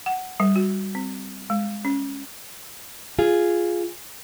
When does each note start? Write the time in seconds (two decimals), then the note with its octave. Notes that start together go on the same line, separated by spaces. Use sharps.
0.06 F#5
0.40 G3
0.56 F#4
0.95 C4
1.50 G#3
1.85 C#4
3.19 F4 G#4